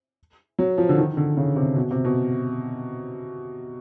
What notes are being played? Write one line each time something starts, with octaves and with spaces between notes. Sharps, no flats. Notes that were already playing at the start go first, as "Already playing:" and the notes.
F#3
F3
D3
D#3
D3
C#3
C3
B2
C3
B2